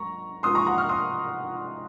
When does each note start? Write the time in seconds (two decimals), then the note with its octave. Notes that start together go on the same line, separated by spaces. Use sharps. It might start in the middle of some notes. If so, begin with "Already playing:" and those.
Already playing: G#2 F#3 A#3 A#5 C#6
0.43 G#2 F3 A#3 C6 D#6
0.55 A#5 C#6
0.66 F#5 A#5
0.78 C#6 F6
0.89 C6 D#6